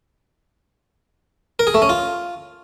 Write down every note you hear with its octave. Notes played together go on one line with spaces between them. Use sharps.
A#4
G#4
A3
C#4
F4